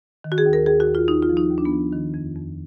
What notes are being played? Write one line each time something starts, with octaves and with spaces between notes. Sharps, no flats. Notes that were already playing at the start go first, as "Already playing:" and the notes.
D#3
F#4
G#4
D#2
A#4
D#2 G#4
F#4
D#2
F4
D#2 D#4
F4
F3
D#4
D#2
D4
B3
F3
D#3
F2
F2